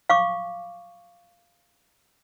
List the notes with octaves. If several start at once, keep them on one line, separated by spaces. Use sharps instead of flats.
F5 C#6 D6